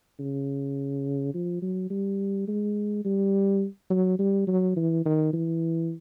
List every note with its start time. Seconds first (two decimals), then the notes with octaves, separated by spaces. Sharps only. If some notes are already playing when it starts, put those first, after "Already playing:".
0.19 C#3
1.34 F3
1.62 F#3
1.90 G3
2.48 G#3
3.05 G3
3.90 F#3
4.19 G3
4.47 F#3
4.76 E3
5.06 D#3
5.33 E3